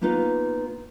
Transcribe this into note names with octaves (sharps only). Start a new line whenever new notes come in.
A#3 B3 D#4 F4 B4